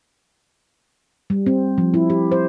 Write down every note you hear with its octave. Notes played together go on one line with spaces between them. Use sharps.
G3
C4
F3
E4
G4
C5